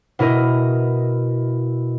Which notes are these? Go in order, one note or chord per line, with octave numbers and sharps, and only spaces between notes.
B2 E4 A#4 D#5